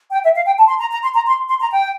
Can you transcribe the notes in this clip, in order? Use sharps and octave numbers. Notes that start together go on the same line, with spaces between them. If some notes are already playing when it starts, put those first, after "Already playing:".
G5
E5
F5
G5
A5
C6
A#5
A#5
C6
A#5
C6
C6
A#5
G5